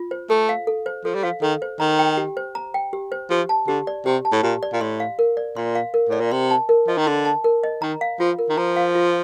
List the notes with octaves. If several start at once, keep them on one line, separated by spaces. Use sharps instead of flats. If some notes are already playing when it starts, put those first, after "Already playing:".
Already playing: F4
C5
A3 A4
F5
A4
C5
F3 A4
G3
F3 F5
D#3 A4
C5
D#3 A#5
G5
G4
C5
A#5
G5
G4
C5
F3 G4
A5
D3 G4
D5
C3 G4
A5
A2
A#2 G4
D5
A#2
A2 C6
F5
A#4
D5
A#2 C6
F5
A#4
A2 D5
A#2
C3 C6
A5
A#4
F3 D#5
D#3
D3 C6
A5
A#4
D#5
D#3 A#5
F5
F3 F4
A#4
D#3
F3 A#5
F5
F4